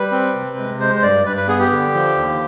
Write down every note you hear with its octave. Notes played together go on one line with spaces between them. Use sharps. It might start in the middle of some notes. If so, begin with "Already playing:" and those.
Already playing: G3 B4
C4
C3
G#3
G#3 C5
C5
G2 D5
G2 B4
B4
B3 G#4
G4
D3
F3
D#2